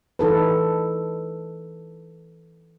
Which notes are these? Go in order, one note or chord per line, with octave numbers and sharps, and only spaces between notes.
E3 D#4 A4 B4